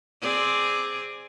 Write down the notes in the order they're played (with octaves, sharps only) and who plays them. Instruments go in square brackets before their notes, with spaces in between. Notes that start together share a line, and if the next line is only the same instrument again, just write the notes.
[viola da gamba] C4 G#4 D5